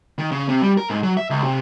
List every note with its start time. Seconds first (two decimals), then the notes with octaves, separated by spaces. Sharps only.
0.18 D#3
0.32 C#3
0.49 C3
0.62 G3
0.78 A#4
0.90 G#2
1.03 F#3
1.17 E5
1.30 C#2
1.44 C3